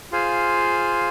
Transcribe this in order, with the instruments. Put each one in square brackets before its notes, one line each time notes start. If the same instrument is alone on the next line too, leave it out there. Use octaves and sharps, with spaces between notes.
[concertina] F4 G#4 C5 F5 G#5